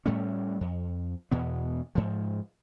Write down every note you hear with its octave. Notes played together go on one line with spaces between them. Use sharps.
A2 G3 A3 C#4
F2
E2 B2 B3
G#2 F3